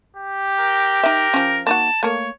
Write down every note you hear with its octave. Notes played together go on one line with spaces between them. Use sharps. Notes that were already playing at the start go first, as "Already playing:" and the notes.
G4
A#4
D#4 A#4 E5
F3 C#4
A#3 D#4 F#4 A5
A3 A#3 C#5